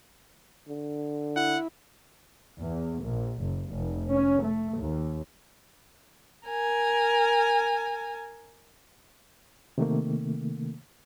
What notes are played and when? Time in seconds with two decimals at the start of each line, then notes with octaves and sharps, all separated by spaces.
0.69 D3
1.36 E4 F#5
2.60 E2
3.02 A#1
3.40 F#1
3.70 F1
4.11 C#4
4.44 A3
4.78 D#2
6.48 A#4 G#5
9.78 C3 D#3 A3 A#3